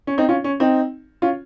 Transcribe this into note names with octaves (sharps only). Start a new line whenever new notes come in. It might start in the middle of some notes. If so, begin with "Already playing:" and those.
C#4
C4 D#4
C#4 F4
C#4
C4 D#4
C#4 F4